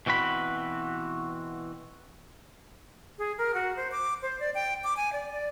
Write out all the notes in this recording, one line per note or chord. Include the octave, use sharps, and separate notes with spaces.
B2 E3 C4 F#4 B5
G#4
A#4
F#4
C5
D6
C5
D5
G5
D6
G#5
D5
D5